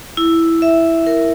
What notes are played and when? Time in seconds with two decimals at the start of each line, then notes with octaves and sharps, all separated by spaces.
0.17 E4
0.62 E5
1.07 A#4